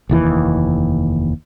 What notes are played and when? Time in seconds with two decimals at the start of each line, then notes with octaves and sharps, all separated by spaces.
0.09 F1 D#2 E3